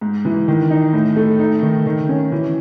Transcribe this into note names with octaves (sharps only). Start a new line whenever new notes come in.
G#2
E3
D#3
D#4
A2
A3
D#4
D#3
D#3
C#4
E3